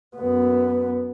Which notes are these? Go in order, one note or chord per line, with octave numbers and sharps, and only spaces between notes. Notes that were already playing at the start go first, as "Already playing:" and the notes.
F#2 B3